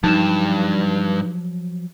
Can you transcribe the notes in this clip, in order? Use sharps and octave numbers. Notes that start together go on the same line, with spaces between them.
G2 F3 F#3 D#4 E7